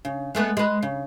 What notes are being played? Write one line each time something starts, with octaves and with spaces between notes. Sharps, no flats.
C#3
G#3 A3 B3
G#3 B4
C#3